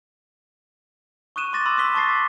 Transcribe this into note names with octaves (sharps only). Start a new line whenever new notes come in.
C#6 D#6 F#6 D#7 E7
C6 D6 A6 A#6 E7
B5 C6 E6
C6 D#6 E6 F#6 B6 G7
A5 C#6 A6 A#6 C7
D6